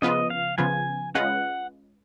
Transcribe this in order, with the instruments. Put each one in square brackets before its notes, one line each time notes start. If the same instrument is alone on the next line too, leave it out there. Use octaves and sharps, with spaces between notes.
[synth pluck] C#3 F3 B3 F4 B4 [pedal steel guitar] D#5
[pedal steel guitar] F5
[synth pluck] C#3 F3 B3 F4 B4 [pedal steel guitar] G#5
[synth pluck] G#3 C#4 F4 B4 D#5 [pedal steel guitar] F#5